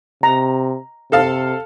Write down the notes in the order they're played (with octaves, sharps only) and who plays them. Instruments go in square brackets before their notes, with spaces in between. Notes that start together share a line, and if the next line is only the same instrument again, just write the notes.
[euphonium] C3 [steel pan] A#5
[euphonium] C3 [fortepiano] A4 F5 A5